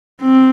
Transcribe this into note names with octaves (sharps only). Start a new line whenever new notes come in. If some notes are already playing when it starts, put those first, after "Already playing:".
C4